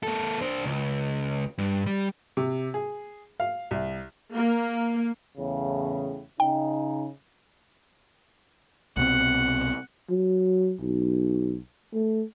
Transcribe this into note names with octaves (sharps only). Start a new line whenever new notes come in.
A#3 A4
D4 C5
C#2
G2
G3
C3
G#4
F5
C2
A#3
E2 A2 C#3
C#3 D#4 G5
C2 B2 C4 F#5
F#3
B1
A3